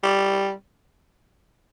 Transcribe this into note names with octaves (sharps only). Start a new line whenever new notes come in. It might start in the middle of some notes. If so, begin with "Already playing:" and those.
G3